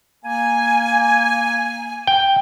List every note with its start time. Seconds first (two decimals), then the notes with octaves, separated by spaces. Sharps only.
0.24 A#3 G#5
2.07 G5